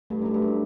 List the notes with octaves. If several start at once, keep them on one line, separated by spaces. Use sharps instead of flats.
G2 A3
F#2 A3
G2
A4